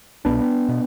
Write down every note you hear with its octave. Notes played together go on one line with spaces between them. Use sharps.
C2 B2 B3 D4
B2